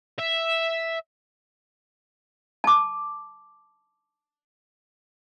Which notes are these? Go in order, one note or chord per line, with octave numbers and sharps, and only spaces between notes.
E5
A5 D6